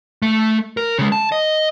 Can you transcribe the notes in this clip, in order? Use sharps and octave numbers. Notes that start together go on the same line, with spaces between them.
A3
A#4
C#3 G#3
A5
D#5